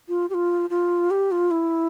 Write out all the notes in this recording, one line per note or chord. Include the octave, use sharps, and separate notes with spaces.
F4
G4
F4
F4
G4
F4
E4